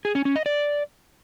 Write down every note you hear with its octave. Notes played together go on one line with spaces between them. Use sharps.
G#4
C#4
C#4
D#5
D5